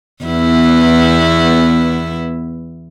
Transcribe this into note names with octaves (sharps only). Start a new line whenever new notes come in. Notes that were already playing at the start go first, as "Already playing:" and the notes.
E2 B3 E4